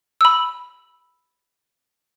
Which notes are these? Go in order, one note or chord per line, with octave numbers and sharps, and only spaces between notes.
B5 E6